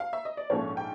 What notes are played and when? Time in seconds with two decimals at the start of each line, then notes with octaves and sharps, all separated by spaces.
0.00 F5
0.13 E5
0.25 D#5
0.37 D5
0.50 A#1 G#2 F3 A3 C#4 C#5
0.77 G5